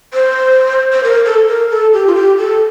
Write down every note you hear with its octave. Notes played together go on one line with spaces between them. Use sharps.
C5
C5
A#4
A4
A#4
A4
G4
F4
G4
A4